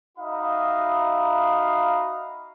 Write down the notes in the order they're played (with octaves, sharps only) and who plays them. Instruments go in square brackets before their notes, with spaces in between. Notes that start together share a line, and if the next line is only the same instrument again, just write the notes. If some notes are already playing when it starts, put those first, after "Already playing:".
[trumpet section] D#4 F#4 E5 F5 B5 D#6